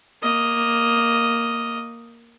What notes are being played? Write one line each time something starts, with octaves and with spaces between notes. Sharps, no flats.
A#3 D#5